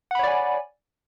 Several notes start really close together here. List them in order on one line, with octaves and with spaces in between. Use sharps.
F#5 B5 C#5 D5 G#5